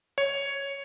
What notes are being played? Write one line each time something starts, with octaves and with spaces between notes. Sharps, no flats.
C#5